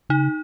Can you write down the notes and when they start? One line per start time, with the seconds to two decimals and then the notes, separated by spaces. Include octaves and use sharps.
0.09 C#3 D#4